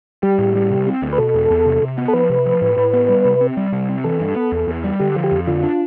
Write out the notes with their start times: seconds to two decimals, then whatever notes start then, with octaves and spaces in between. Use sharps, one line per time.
0.23 G3 G4
0.39 A2
0.55 G3
0.71 C3
0.87 C4
1.02 D2
1.13 B4
1.18 B2 A4
1.34 E2
1.50 E2
1.66 C3
1.82 C3
1.98 B3
2.08 A4
2.13 F3 B4
2.30 C3
2.46 F3
2.62 A2
2.77 A2
2.93 B3
3.09 G3
3.25 C3
3.41 C4
3.57 G3
3.72 C3
3.89 C4
4.04 E3 A4
4.21 G2
4.36 B3
4.52 E2
4.68 E2
4.84 G3
5.00 D3 G4
5.16 F3
5.24 G4
5.32 F2
5.47 D3 F4
5.63 D4